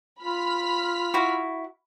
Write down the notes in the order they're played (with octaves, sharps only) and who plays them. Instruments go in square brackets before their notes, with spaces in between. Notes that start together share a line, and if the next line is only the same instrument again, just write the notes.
[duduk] F4 [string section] B5 F6 B6
[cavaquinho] E4 F#4